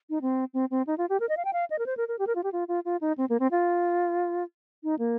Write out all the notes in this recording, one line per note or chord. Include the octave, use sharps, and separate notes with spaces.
D#4
C4
C4
C4
D#4
F4
G4
A#4
D#5
F5
G5
F5
D#5
A#4
C5
A#4
A#4
G4
A#4
F4
G4
F4
F4
F4
D#4
C4
A#3
C4
F4
D#4
A#3